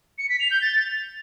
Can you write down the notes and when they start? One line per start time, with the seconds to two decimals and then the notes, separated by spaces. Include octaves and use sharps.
0.18 C#7
0.29 B6
0.40 F7
0.51 G6
0.62 A6